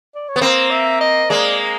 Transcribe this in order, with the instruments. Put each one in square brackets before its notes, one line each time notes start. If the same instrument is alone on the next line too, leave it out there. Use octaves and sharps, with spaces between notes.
[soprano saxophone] D5
C#5
[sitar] B3
[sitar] A#3 C4 [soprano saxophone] C5
[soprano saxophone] E5
D#5
[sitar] G#3 A#3 [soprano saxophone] D5